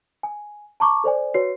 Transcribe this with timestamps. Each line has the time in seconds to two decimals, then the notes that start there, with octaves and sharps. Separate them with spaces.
0.23 G#5
0.80 A5 A#5 C#6 D6
1.04 A4 C5 D5 G#5
1.34 F#4 B4 C#5 C7